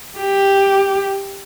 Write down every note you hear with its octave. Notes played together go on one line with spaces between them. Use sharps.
G4